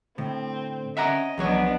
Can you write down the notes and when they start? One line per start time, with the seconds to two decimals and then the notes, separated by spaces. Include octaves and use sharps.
0.18 A2 D3 C4
0.97 C#4 D#5 E5 F#5 A#5
1.38 B1 E2 F3 F#3 B3 D4 C#5